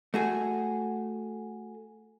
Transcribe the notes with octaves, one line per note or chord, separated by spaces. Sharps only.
A3 F#4 G#4